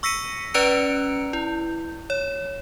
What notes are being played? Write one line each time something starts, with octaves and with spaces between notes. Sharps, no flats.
C#6 E6 A#6 B6 C#7 D#7
C#4 B4 D5 A#5 F#6 C#7
E4
C#5